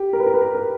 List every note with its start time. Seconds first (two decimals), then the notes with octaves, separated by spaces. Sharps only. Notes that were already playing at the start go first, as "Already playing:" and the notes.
Already playing: G4
0.13 A#4
0.20 B4
0.27 A#4
0.34 B4
0.41 A#4
0.55 A#4